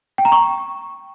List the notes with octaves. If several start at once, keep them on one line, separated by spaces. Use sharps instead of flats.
G5
A#5
C#6